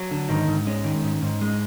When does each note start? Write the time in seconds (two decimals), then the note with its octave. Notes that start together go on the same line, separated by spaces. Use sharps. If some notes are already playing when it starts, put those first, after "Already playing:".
Already playing: F#3
0.11 D3
0.29 G#2 D#3 D#4
0.47 G#2
0.67 G#3 C#4
0.84 D#3
1.04 G#2
1.22 G#2
1.41 G#3